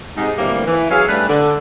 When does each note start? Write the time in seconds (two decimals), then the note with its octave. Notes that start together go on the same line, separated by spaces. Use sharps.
0.17 G#2 C3 G#3 D#4
0.38 D2 A2 C3 E3 G3 A#3
0.66 E3
0.91 F#3 C#4 G#4 E5 F5
1.08 G3 A3 D4 B4
1.29 D3